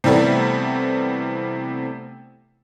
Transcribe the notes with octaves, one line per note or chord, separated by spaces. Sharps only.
C3 E3 G3 A3 B3